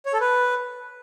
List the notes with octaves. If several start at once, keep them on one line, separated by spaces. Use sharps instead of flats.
C#5
A4
B4